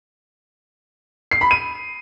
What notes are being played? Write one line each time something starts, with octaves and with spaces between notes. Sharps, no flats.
C7
B5
D#7